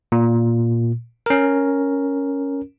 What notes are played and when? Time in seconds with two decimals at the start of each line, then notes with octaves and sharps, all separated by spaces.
0.12 A#2
1.26 C#4 A#4